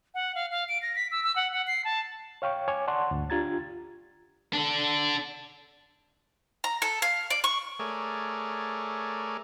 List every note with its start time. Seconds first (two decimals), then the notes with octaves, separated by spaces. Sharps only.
0.14 F#5
0.35 F5
0.51 F5
0.69 D7
0.82 A#6
0.96 B6
1.11 E6
1.24 E6
1.36 F#5
1.52 F#5
1.67 C7
1.85 A5
2.42 C#5 F5 G5 C#6
2.68 C#5 G#5 D6
2.87 D5 F#5 A5 C6 C#6
3.11 D2 G#2
3.30 D4 F4 G4 A#5 G#6 A6
4.53 D4 A4
6.64 A#5
6.82 A4
7.02 F5
7.30 D5
7.44 C#6
7.79 A3 G#4 A#4 C#5 D5